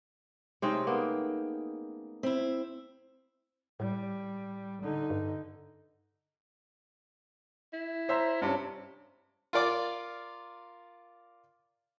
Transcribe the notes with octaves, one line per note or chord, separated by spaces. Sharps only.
C3 G#3 A3 C4 C#4 D#4 G5
A#3 B3
C4 E4 E5
A2 G3
D3 D#4
G2
E4
C5 E5 A#5
G2 C3 C#4
F4 A#4 D5 D6